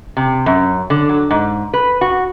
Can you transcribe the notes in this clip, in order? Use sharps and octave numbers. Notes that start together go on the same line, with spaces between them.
C3
F#2
D3
F#3
G#2
B4
F#4